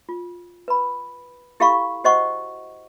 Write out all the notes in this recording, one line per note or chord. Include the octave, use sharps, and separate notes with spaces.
F4
B4 B5
E4 G4 A4 F5 B5 C#6
F#4 C5 D#5 F#5 C#6